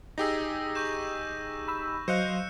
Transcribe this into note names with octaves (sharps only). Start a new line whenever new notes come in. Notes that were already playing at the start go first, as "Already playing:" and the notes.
D#4 G4 G#4 E6 A#6
C#6 G6 E7
B5 E6
F#3 C5 D#5 F5 F#6 C#7 E7